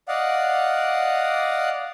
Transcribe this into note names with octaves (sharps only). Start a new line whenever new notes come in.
D5 D#5 F5 F#5